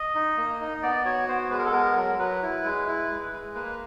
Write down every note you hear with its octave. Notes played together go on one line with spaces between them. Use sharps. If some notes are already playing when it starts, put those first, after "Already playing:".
Already playing: D#5
D#4
A#3
D#4
B3 D5
F#4 C#5
B3 C5
G#3 B4
A#4
A4
B3 A#4
F#3
F#3 B4
E4
G#3
E4
G#3
G#3
A#3 B4